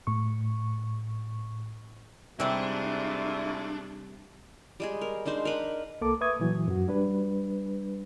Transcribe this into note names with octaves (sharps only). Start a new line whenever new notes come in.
A2 C#6
G#2 C3 G3 A3 D4 E4 F4
G3 G#3 G#4
A#4
G#3 D4 D#4 C5
A#4 B4
C2 A#3 A4 A5 D6
B4 E5 C#6 D#6 G#6
A#2 E3 F#3
F#2 F#4
G3 D4 B4